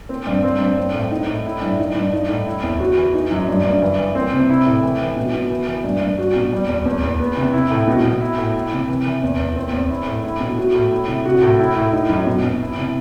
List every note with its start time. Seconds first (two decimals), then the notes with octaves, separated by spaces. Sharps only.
0.09 C4
0.27 G2
0.43 C4
0.60 G2
0.78 C4
0.94 A2
1.11 D#4
1.28 A2
1.46 E4
1.61 G2
1.79 D#4
1.95 G2
2.13 D#4
2.29 A2
2.46 E4
2.63 E2
2.80 F#4
2.98 E3
3.13 D#4
3.31 F#2
3.48 G2
3.64 G2
3.82 E3
3.98 E3
4.15 C4
4.33 C3
4.49 E4
4.66 A2
4.83 E3
5.01 E3
5.16 B2
5.34 B2
5.51 E3
5.67 E3
5.84 G2
6.01 G2
6.19 F#4
6.36 B2
6.53 G3
6.69 E2
6.85 E2
7.03 E2
7.19 B3
7.37 C3
7.53 E4
7.71 A2
7.87 B2
8.05 B2
8.21 E4
8.38 A2
8.55 E4
8.72 C3
8.89 E3
9.06 E3
9.23 E2
9.39 E2
9.56 C4
9.73 E2
9.90 E4
10.07 A2
10.23 E4
10.40 B2
10.58 F#4
10.75 A2
10.91 E4
11.08 C3
11.25 F#4
11.43 A2
11.59 E4
11.76 A2
11.93 D#4
12.09 F#2
12.27 B2
12.44 B2
12.61 E4
12.77 C3